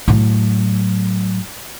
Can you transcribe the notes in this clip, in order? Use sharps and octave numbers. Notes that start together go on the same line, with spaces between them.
A2 F#3